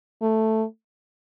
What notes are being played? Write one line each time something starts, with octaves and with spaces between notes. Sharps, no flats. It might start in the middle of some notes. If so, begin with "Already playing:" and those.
A3